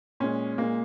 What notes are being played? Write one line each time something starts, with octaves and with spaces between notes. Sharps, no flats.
A#2 G#3 C#4
A#2 G#3 A#3